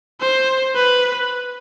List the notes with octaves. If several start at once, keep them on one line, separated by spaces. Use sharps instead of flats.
C5
B4